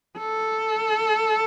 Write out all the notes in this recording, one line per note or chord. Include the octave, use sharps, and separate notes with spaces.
A4